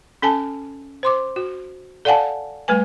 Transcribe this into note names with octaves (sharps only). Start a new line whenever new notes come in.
C#4 A4 G#5 A5
C5 C6 D6
F#4
A4 D5 F5 F#5 G#5 A5
G3 A3 B4 G#5